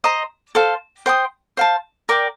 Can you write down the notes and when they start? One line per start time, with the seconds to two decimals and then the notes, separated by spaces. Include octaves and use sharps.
0.04 C5 D#5 A#5 D#6
0.55 A4 C5 F5
1.06 C5 G5 C6 D#6
1.57 C5 F5 A5
2.09 A#4 D5 G5 D6